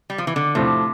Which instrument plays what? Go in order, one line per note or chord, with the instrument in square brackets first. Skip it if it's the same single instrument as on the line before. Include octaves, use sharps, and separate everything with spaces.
[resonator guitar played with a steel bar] G3
F3
E3
D3
[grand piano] A2 F3 A3 [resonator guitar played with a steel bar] C3